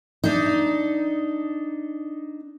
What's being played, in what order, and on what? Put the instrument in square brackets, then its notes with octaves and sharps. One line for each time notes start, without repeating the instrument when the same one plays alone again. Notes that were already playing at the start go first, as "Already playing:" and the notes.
[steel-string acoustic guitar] D4 D#4